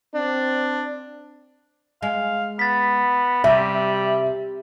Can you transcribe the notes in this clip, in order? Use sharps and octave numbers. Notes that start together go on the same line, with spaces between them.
C4 D4
G#3 F5
B3 A6 B6
C3 G3 E5